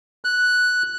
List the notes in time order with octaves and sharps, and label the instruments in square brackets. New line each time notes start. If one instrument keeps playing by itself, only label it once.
[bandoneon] F#6